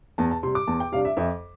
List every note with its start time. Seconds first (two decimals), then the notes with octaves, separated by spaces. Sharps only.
0.18 E2 A5
0.31 A5
0.43 C3 C6
0.47 G3
0.55 D6
0.67 E2 A5
0.80 G5
0.92 C3 G3 D4 F5
1.05 E5
1.17 F2 E5